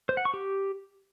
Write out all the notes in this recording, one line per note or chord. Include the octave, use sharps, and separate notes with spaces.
C5
F#5
C#6
G4